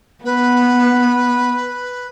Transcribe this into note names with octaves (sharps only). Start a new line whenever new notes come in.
B3 B4